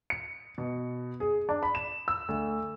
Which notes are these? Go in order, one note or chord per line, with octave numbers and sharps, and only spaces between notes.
C#7
B2
G#4
D4
B5
E7
E6
D2